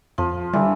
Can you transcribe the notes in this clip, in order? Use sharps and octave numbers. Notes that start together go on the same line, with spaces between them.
F2 F3
D3 E3 G3